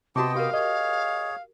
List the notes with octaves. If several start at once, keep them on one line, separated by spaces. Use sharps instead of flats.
C3 B3 F#4 G4 D#5 G5 A5 D6
G4 A#4 F5
G#4 C#5 D#5